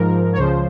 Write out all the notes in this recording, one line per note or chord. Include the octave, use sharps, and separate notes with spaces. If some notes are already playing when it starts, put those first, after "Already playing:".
Already playing: G#2 F3 A#4
C#5
C#2 C#3 F3 C5